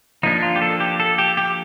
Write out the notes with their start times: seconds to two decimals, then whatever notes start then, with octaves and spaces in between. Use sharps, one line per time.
0.23 F3 A#3 D4 D#4
0.42 F4
0.56 G4
0.62 A4
0.80 G4
1.00 A4
1.18 G4
1.37 G4